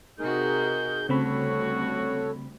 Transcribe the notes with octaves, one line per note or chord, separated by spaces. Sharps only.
C3 D#4 F#4 G#4 A#4 G6
D2 C#3 G3 C4 F#4 A4 C#5 B5